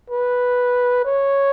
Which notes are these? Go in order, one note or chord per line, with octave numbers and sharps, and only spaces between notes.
B4
C#5